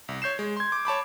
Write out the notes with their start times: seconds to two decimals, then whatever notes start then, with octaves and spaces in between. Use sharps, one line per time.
0.08 C2
0.22 C#5 G6 C7 E7
0.39 G#3
0.56 C6 G#6
0.72 D6
0.85 C#5 A5 B5 D6